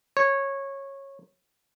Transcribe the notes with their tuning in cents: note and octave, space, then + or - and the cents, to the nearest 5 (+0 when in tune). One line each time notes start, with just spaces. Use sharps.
C#5 -15